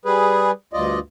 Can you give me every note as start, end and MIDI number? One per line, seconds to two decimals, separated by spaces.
0.05 0.51 55
0.05 0.51 68
0.05 0.51 71
0.73 0.99 38
0.73 0.99 43
0.73 0.99 65
0.73 0.99 74
0.73 0.99 75